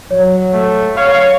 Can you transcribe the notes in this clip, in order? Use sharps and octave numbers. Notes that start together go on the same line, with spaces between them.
F#3 C#5
A3
C#5 F5